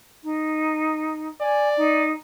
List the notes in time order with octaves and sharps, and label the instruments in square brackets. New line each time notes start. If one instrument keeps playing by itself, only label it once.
[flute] D#4
[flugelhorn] D5 [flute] G#5
[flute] D#4